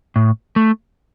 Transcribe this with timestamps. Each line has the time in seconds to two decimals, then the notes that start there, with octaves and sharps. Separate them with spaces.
0.16 A2
0.56 A3